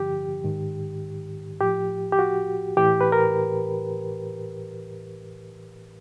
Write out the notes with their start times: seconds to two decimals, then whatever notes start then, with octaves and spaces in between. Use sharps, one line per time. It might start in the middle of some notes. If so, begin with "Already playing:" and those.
Already playing: G2 D3 F3 G4
0.44 G#2 D#3
1.60 A2 F3 G4
2.12 G4
2.19 F#4
2.77 A2 E3 G4
3.01 B4
3.12 A#4